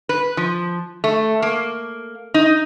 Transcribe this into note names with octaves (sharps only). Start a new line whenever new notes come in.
B4
F3
A3
A#3
D#4